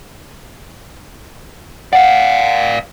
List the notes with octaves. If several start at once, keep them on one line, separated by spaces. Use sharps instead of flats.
D5 F5 F#5